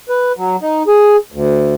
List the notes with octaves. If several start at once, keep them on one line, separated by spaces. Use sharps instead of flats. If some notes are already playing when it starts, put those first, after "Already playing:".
B4
F#3
D#4
G#4
D2